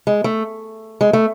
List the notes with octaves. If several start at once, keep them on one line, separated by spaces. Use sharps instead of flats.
G#3
A3
G#3
A3